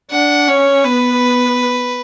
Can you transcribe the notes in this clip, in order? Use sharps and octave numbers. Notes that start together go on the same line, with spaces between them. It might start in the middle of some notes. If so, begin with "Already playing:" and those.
D4 F#5
C#4 C#5
B3 B4